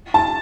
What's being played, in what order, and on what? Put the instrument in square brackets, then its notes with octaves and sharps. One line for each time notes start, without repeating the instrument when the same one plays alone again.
[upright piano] A5